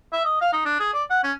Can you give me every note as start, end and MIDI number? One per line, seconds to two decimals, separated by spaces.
0.13 0.24 76
0.25 0.40 75
0.41 0.50 77
0.53 0.63 63
0.65 0.78 62
0.80 0.90 68
0.94 1.04 74
1.10 1.23 78
1.24 1.32 61